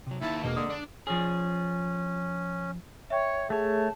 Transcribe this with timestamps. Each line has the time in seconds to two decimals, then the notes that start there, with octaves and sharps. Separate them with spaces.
0.07 C3 F#3
0.21 D#2 D#4 E4 A5
0.44 E1 B2 A#3 D#5
0.56 D3 D#6
0.70 D4
1.07 F3 C#4 G#4
3.10 C#5 E5 G5
3.50 A3 G#4 C#5 A5